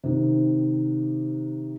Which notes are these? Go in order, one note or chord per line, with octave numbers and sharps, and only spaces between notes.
C3 D#3